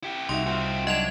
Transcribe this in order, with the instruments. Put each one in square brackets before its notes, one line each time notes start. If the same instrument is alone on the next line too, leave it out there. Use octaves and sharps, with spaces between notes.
[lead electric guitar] E4 G4
[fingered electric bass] C2 [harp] D#4 F#4 E5 [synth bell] C6
[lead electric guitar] C4 F#4 [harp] F4 G5
[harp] F#3 C5 [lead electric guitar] D4 [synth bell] D#5 G#6 F7